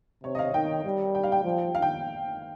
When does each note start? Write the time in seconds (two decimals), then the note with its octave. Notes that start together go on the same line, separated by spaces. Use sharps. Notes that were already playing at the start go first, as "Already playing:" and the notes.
0.24 C3 C#5
0.35 D#5
0.39 F5
0.54 D#3 G5
0.85 G3
1.15 G5
1.23 F5
1.32 G5
1.44 F3
1.75 F5
1.82 G5